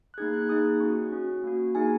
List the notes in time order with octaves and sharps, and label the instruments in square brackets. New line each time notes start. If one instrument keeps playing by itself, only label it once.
[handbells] F#6
A#3 D#4 G#4 G#6
F#6
A#3 D#4 G#4 D#6
C#4 F#4 C#6
C#4 F#4
A#3 F#4
A#3 D#4 G#4 G#5